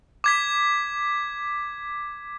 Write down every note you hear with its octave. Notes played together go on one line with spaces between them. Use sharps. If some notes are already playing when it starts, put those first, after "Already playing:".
D6 G#6 B6